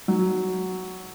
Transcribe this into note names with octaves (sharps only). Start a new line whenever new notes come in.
F#3